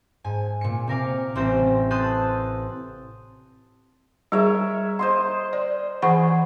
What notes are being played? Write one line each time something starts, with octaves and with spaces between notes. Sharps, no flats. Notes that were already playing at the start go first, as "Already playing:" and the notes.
G#2 G#5
A#2 C#7
C3 A#4 F5 D6
A1 G3 C4 C5 G6
A4 C6 D#6 F#6 G6 A6
G3 G#4 A#4 C#5 E5
C5 D#5 C6
D5
E3 G#4 F#5 C#6